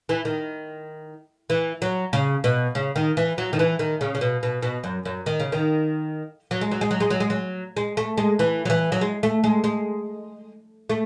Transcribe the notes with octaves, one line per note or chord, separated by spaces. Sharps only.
E3
D#3
E3
F#3
C#3
B2
C#3
D#3
E3
F#3
D#3
E3
D#3
C#3
C#3
B2
B2
B2
F#2
F#2
D#3
C#3
D#3
F#3
G#3
F#3
G#3
F#3
G#3
F#3
G#3
F#3
G#3
A3
G#3
E3
F#3
E3
F#3
G#3
A3
G#3
G#3
A3